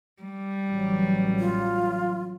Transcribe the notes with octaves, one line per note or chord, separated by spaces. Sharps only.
G3
A1 F#3
F4